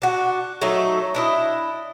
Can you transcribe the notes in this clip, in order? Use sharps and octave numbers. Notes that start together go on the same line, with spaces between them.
D4 F#4
F#3 A3 D#4
D4 E4 D#5